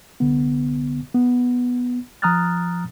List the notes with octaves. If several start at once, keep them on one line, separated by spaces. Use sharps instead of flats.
C2 D3 B3
B3
F3 A#5 D#6 F6 F#6 A6